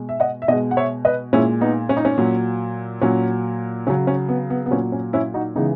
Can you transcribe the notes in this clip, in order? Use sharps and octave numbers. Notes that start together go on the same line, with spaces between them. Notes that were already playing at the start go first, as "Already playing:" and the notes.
Already playing: B2 G#3
E5
D#5 F#5
E5
B2 G#3 D#5 F#5
F#5
C#5 E5
B4 D#5
A#2 G#3 C#4 E4
B3 D#4
C#4
D#4
C#4
A#2 F#3
A#2 F#3 C#4
C#3 F#3 C#4
C#4
B3
B3
B3
A#2 F#3 C#4
C#4
C#4 E4
D#4 F#4
C#3 E3 G#3 B3 D#4